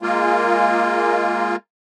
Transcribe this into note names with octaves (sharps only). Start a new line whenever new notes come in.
G#3 A#3 F4